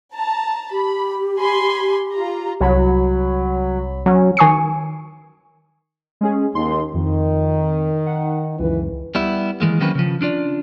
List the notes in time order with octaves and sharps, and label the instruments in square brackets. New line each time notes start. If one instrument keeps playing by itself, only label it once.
[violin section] A5 A#5
[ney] G4 [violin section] B5
[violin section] G#5 B5 C6
F4 A#5
[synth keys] C2 C#5 B5 [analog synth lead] F#3
[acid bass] F#3 [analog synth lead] C#4
[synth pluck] D#3 G#5 C#6 D#6 C7 C#7
[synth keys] G#3 C#4 G#4
[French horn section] D#2 [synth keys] C6
[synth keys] F2 [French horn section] D#3
[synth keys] F#5
[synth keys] C#2 F#2 [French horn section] E3 B4
[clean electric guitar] G3 B3 E4
D#3 E3 G#3 A#3
D#3 F#3 A#3 C4 C#4 B4
C#3 F3
C#4 D4 F4 D5